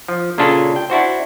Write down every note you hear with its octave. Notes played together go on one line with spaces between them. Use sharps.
F3
A#2 C#3 C#4 D4 F4 A4
G5
D4 E4 F#4 C5